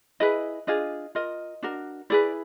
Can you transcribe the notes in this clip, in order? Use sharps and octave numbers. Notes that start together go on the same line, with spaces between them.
E4 G#4 B4 D#5
D4 F4 G#4 D#5
F4 A#4 D#5
D4 F#4 A#4
E4 G#4 B4 D5